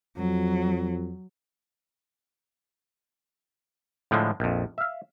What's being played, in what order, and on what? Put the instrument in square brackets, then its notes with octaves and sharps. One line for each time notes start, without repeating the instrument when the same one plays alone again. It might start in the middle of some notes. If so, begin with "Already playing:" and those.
[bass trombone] F2 [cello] F#3
[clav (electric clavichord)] A2 D3 F3 G#3
A#1 F2
E5 F5